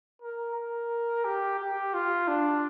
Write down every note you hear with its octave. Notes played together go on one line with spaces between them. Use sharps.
A#4
A#4
G4
G4
F4
D4